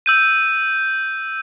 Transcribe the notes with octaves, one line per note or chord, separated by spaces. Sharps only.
E6 G6 D#7